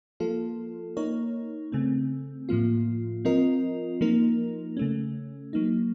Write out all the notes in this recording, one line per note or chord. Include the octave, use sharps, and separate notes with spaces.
F3 A#3 F4 A4
A#3 D#4 A#4 C#5
C#3 A3 C4
A2 F3 A#3 F4
F3 C4 F4 A#4 D#5
F3 A#3 D#4 A#4
C#3 A3 C#4
F#3 A#3 D#4